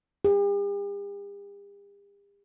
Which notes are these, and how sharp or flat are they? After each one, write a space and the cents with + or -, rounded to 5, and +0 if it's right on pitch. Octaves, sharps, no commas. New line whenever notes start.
G4 +45